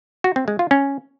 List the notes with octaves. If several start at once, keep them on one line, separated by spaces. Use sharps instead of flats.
F#4
C4
G#3
F4
C#4